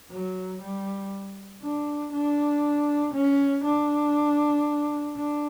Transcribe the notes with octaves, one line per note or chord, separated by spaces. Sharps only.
F#3
G3
D4
D4
C#4
D4
D4